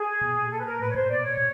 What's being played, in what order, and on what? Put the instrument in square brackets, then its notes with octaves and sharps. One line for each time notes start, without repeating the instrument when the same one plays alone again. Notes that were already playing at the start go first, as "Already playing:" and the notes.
Already playing: [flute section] G#4
[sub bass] B2
A#2
[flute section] A4
B4
A#4
[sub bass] A2 [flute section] B4
[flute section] C#5
[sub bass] A#2 [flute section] C5
[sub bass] B2 [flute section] D5
[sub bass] A#2 [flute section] C#5
[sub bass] A#2